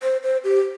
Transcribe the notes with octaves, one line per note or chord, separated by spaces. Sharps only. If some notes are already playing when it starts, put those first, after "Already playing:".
C5
C5
G4